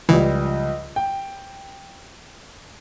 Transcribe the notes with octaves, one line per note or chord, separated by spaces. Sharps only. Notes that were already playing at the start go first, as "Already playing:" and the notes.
C#2 E3 F3 G3
G5